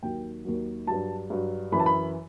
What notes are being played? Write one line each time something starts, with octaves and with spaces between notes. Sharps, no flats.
D#2 D#3 F#3 G5
D#2 D#3 F#3
G2 F#3 A5
G2 F#3
F#2 E3 B5
A5
B5